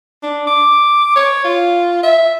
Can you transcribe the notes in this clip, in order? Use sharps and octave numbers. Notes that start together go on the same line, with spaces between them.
D4
D6
C#5
F4
E5